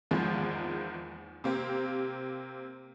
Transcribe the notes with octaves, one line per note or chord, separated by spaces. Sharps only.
E2 G#2 D#3 F3 A#3
C3 A#3 C4 G4